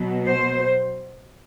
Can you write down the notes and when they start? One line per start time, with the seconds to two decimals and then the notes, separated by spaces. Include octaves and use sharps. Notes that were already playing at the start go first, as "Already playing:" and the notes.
Already playing: B2 F#3 B3
0.26 C5